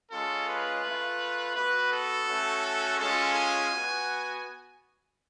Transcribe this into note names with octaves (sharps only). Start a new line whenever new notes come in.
G#3 C#4 F4 A4
B4
A3
F4
B3 F#4 B4
A4
A3 C#4 F#4
G#3 C#4 F4 A4
G#5
B3 F#4